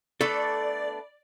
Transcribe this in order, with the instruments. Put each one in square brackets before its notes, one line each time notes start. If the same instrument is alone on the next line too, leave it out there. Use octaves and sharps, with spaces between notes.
[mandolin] A3 B3 D4 [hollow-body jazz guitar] A4 [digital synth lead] D5